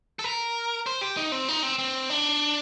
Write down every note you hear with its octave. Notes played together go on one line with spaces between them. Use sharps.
A4
A#4
C5
G4
D#4
C4
D#4
C4
C4
D4